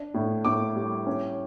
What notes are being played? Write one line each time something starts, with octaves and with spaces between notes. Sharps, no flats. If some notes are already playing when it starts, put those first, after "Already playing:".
Already playing: D4
A2
A2 D6
G3
C#4